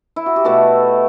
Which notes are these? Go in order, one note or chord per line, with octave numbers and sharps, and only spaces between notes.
E4
F#4
G4
B2 A3 F#4 A4